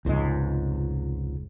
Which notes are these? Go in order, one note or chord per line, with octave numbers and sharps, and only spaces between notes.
F1 C#2 G#2 G#3